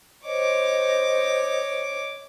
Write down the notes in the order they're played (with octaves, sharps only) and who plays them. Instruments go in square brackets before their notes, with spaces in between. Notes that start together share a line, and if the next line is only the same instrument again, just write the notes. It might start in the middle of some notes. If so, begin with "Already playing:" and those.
[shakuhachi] C5 [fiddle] C#5 D6 [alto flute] D#5